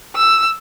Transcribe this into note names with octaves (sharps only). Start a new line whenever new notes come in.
E6